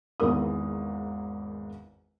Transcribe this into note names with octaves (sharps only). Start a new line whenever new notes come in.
G#1 E2 G#2 A#4 D#6